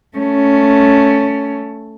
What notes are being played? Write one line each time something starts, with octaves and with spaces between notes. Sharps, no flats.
A3 C#4